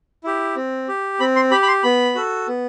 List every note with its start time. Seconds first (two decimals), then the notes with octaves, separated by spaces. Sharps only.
0.24 E4 G4
0.56 C4
0.88 G4
1.20 C4 B5
1.36 C6
1.51 G4 B5
1.63 B5
1.67 C6
1.83 B3 B5
2.15 F#4 A4
2.48 B3